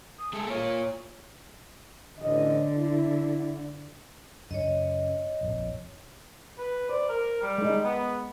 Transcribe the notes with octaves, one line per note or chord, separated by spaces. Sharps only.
D#6
G#3 G#4 A4
A#3 F4 C#5
A1 D3 D#5
E4
F#2 C#3 C#5 D#5
F1 A#1 F2
B4
C5 D5
A#4
G3
G#3 D#4
B3